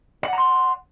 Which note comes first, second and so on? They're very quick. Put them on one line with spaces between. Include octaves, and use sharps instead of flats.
D5 F#5 A#5 C6